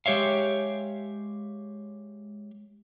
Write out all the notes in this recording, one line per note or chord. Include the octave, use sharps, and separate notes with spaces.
G#3 G4 C#5 E5 F5